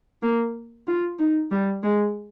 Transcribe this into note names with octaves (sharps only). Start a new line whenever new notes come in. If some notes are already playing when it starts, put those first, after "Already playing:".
A#3
F4
D#4
G3
G#3